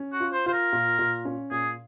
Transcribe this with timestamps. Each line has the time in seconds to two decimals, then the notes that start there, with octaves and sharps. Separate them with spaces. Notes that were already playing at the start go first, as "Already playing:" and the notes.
Already playing: C#4
0.13 F#4
0.20 F4
0.32 C5
0.46 F4 C5
0.53 A#4
0.73 A#2
0.99 A#2
1.25 C#4
1.51 A#2 G#4